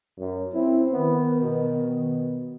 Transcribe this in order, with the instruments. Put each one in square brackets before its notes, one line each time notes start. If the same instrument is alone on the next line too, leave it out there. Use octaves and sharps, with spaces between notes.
[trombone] F#2
[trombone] C4 [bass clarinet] E4
[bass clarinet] D#3 [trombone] B3
[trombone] B2